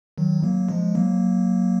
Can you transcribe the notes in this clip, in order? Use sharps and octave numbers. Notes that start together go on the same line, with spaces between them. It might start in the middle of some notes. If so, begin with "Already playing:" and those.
D#3 F#3
F#3 A#3
F3 G#3
F#3 A#3